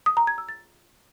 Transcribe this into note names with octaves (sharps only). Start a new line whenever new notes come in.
D#6
A#5
G#6
E6
A6